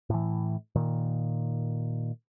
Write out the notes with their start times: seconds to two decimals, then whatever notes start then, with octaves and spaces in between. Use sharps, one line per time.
0.10 A2 E3
0.75 A#2 D#3